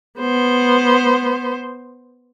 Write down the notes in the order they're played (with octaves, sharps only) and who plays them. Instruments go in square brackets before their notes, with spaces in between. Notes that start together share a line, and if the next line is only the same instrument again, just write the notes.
[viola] B3 C5